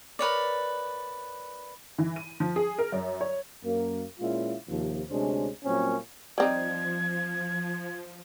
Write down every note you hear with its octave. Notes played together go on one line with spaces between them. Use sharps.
A#4 B4 C#5 D5
E3
D#7
F3
G#4
A#4
F#2
C#5
F#2 A#3
A#2 G#3 C#4 E4 F4
D#2 C3 F3
D2 C3 G#3 C#4 D4 C5
A#2 F#3 G3 A#3 C4 C#4
F3 G3 C4 D#4 G#6